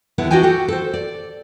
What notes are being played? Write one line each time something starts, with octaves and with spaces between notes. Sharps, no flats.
D#2 D3 B3 E4
D4 F#4 C#5 D#5 G5 G#5
F#4 G4 A4
A4 C5
D5